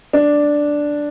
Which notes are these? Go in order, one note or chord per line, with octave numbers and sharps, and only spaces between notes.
D4